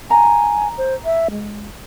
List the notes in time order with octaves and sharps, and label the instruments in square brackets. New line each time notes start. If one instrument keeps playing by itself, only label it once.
[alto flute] G#5 [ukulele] A#5
[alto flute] C5
E5
G#3